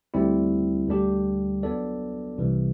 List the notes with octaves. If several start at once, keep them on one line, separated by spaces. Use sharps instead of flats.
D2 D3 G3 C4 E4
D2 D3 G3 D4 G4
F#3 B3 D4 A4 D5
C2 C3 E3 G3